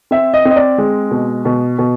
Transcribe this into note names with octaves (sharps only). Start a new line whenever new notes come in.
C4 E5
D#5
C4
D#5
D5
G#3
B2
B2
B2